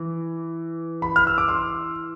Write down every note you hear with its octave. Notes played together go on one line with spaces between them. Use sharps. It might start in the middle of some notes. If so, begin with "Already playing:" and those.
Already playing: E3
B5
F6
E6
D6
C6